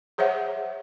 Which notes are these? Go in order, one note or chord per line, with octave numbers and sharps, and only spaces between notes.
G#4 C5 C#5 E5 F#5